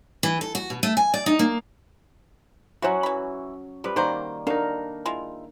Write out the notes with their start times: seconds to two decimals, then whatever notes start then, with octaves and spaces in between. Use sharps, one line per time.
0.23 E3
0.41 A4
0.55 F#4
0.70 B2
0.83 A3
0.97 G#5
1.14 D5
1.26 D#4
1.39 A#3
2.82 F#3 C#4 E4 F#4 C5 F#5
3.03 E3 B5
3.84 F3 G3 B4
3.96 D#3 A#3 C4 F#4 C5 D5
4.47 F#3 D4 D#4 A#4 F5
5.06 G#3 E4 F4